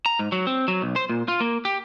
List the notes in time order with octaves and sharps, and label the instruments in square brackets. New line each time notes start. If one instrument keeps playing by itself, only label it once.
[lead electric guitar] A#5
G#2
F#3
C4
F#3
B1
C5
A#2
F4
A#3
G4